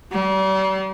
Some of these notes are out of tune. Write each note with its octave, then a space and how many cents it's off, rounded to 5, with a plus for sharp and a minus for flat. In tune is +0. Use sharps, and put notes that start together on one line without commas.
G3 -40